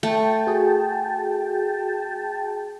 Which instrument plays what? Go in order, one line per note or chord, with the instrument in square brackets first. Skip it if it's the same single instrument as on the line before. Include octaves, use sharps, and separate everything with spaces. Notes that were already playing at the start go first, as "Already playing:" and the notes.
[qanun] A3 [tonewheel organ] G5 A5
[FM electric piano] F#4 G#4